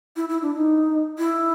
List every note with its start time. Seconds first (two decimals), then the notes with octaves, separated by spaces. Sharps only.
0.16 E4
0.29 E4
0.42 D4
0.55 D#4
1.18 E4